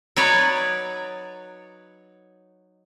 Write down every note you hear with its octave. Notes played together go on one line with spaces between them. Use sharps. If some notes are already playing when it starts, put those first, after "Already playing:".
F#3 D#4 B4 C#5 D5